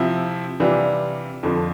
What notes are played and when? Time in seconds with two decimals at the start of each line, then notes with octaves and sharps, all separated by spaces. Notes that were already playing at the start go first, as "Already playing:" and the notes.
Already playing: C3 F3 C4 E4
0.60 C3 E3 G3 D4 F4
1.43 F2 D3 F3